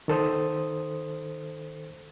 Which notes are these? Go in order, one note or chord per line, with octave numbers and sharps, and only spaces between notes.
D#3 A4 C5 D#6